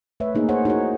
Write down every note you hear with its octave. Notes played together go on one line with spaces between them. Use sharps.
A3 B4 C#5 E5
A#3 D#4 G#4
G#4 C5 C#5 F#5
D#4 E4 F#4 G#4 A#4 C#5